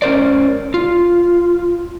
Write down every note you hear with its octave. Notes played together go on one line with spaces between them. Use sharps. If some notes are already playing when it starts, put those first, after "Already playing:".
C#4 A#4 C5 D5
F4